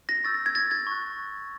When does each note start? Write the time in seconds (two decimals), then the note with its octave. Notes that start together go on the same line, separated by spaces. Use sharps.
0.09 A#6
0.24 C#6 E6 G6 A6
0.34 A6
0.46 G#6
0.55 A6
0.71 G#6
0.87 C#6 F#6